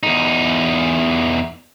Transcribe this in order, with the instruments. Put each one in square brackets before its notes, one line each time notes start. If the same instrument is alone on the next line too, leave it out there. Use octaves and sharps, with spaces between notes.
[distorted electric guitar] E2 D#4